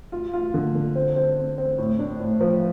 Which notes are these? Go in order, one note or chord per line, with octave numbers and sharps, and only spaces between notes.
F4
F4
D3
D3
C4
C4
C4
C4
A2
D4
A2
F3